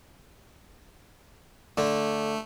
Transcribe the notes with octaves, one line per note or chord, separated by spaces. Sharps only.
D3 A3